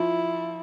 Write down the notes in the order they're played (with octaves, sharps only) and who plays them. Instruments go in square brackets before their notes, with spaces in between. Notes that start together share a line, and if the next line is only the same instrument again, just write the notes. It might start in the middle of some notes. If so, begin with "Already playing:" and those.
Already playing: [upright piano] F3 [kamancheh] E4